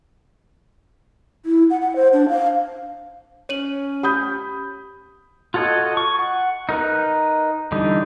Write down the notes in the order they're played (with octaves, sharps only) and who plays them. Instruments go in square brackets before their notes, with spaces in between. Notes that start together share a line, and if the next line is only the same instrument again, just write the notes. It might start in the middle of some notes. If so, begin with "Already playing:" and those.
[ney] E4
F#5
F#5
C5
D4
F5
[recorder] C#4 [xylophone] C#5 D#7 F#7
[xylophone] G4 [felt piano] B5 D#6 G6
[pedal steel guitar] F4 F#4 A4 C#5 D#5
C#6
F#5
D#4 A#4 B4
D3 E3 G3 D#4